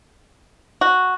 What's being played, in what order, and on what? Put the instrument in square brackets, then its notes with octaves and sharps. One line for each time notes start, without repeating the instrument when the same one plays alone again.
[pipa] F#4